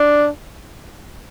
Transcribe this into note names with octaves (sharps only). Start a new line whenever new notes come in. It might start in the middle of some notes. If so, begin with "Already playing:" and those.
Already playing: D4